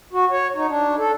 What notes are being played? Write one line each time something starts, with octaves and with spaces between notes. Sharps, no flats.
F#4
C#5
D#4
D4
A4